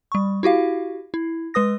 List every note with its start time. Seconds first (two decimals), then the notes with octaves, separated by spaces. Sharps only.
0.12 G3 C#6
0.43 E4 F#4 G4 F5
1.14 E4
1.54 G#3 B4 D#6 A#6